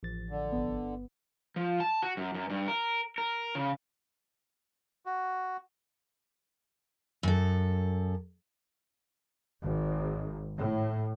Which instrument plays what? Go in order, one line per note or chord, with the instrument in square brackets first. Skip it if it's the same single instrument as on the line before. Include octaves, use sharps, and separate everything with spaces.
[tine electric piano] A1 F3 A6
[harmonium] D3
[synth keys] G1 B3
[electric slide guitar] F3
A5
F#4
F#2
F#2
G2
A#4
A#4
C#3
[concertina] F#4
[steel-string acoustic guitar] F#2 A4
[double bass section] G#1
A2